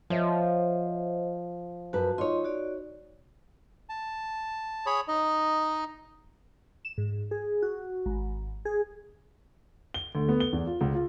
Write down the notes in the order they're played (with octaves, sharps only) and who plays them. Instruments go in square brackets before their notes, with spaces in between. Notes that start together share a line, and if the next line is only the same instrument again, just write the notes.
[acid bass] F3 [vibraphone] C5 D#5 [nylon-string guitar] C#5 E5 F#5
[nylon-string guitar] F#2 B4 [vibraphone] F#4 A5
[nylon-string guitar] D#4 C#5 [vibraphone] F4 D#5 C6
[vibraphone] F#4 D5
[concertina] A5
G#4 C#5 B5
D#4 D#5
[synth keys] E7
G#2
G#4
F#4
G#1
G#4
[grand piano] G7
D2
B3
G7
E2
F4
C#2
F4